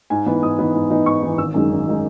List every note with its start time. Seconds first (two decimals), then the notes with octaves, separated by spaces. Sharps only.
0.10 G#2 G#5
0.26 E3 B3 D#4
0.42 G#2 D#6
0.58 E3 B3 D#4
0.74 G#2
0.90 E3 B3 D#4
1.06 G#2 C#6
1.22 E3 B3 D#4
1.38 G#1 E6
1.54 F#2 D#3 G#3 D#4
1.70 G#1
1.87 D#3 G#3 D#4